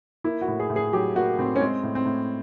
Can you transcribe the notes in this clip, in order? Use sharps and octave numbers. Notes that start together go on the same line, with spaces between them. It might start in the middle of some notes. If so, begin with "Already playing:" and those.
A#3 E4
F#4
A2
G#4
A2
G#4
F#3 G4
A#3 F#4
A2 C4
C#4
G#3 C4
A2
C4
A2